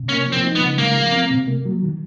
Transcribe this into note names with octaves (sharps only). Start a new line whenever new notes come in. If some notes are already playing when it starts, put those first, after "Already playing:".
Already playing: C3
A#3 C#4
F3
C4
D#4
B3
C#3
G#3 A#3
F3
C4
C3
A#3
F#3
D#3